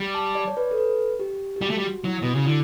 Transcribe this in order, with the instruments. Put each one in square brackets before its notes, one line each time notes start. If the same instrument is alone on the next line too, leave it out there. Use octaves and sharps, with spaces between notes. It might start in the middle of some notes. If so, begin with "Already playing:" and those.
Already playing: [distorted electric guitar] G3
[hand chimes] A5
D5
C#5
B4
A4
B4
G4
G4
[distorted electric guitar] G3 [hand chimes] F#4
[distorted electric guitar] A3
G3
[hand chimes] F#4
[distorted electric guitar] F#3 [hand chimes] E4
[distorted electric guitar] B2 [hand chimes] F#4
[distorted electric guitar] C#3
[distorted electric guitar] D3 [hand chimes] E4